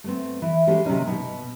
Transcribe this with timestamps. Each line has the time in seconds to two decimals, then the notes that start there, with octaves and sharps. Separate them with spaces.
0.04 A3 B3 C4
0.42 E3
0.67 G#3 C#4 F#4 G4 A4
0.85 C3 D#3 F#3 A#3 C#4 D#4
1.07 B2